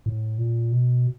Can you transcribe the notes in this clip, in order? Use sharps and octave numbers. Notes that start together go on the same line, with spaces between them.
A2
A#2
B2